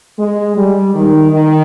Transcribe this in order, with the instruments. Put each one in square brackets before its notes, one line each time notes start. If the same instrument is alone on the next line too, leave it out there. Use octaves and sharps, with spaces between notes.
[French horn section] G#3
G3
D#3
D#3